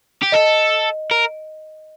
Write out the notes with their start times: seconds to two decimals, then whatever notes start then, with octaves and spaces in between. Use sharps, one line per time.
0.22 G4
0.32 A4 D#5
1.11 A#4